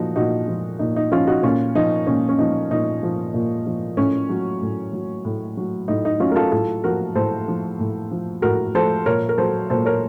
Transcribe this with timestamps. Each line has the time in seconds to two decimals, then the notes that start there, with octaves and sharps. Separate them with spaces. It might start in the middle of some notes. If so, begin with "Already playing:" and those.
Already playing: A#2 F3 D#4 F#4
0.16 A#2 D#4 F#4
0.48 F3
0.79 A#2 D#4
0.96 D#4
1.11 F3 C#4 F4
1.27 D#4 F#4
1.43 A#2 C#4 F4
1.75 F3 D#4
2.07 A#2 C#4
2.29 C#4
2.39 F3 D#4
2.70 A#2 D#4
3.03 F3
3.34 A#2
3.66 F3
3.97 A2 C#4
4.29 F#3
4.62 A2
4.93 F#3
5.25 A2
5.57 F#3
5.88 A2 D#4
6.05 D#4
6.20 F#3 C#4 F4
6.31 A#4
6.36 F4 A4
6.52 A2 F4 A4
6.84 F3 F#4 A#4
7.15 A2 A4 C5
7.48 F3
7.80 A2
8.11 F3
8.42 A2 F#4 A#4
8.75 F3 A4 C5
9.06 A#2 A#4 C#5
9.29 A#4
9.38 F#3 A4 C5
9.70 A#2 A4 C5
9.85 A#4 C#5